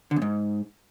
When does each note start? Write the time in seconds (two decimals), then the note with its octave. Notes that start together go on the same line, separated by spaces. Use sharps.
0.11 D3
0.16 E2
0.22 G#2